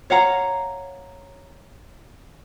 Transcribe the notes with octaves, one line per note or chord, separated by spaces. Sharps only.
C#5 F5 F#5 A#5